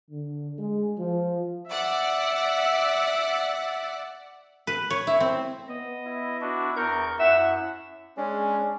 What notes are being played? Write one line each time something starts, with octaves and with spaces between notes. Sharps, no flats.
D3
G#3
F3
D5 E5 F#5
B4
C#5
E4
C4
B3 D#5
E4
D4 F#4
E2 A#4 C#6 G6
F#2 E4 E5 F#5
G#3 C#4 D4